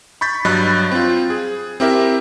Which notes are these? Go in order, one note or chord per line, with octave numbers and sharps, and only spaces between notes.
B5 C#6 G6 A6 B6
G2 F#3 D#5 B5 F#6 A6
C4 F4
G#4
C4 E4 G4 A#4 E5